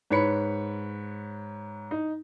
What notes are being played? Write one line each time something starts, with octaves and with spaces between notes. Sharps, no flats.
G#2 B4 C#5 B5 C#7
D#4